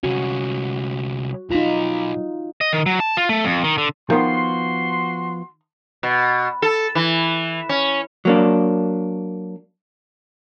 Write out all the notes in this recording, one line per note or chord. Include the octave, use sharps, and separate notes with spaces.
C2 C#4 F#4
B1 D#4 F4 A#5
D#5
D#3
F#3
A5
F4
A3
F2
D#3
D3
D#3 F3 B3 F#4 C6
B2
A4
E3
C#4
F#3 A#3 D4